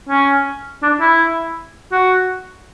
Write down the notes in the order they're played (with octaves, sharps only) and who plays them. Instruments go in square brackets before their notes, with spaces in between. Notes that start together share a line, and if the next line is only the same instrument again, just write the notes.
[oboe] C#4
D4
E4
F#4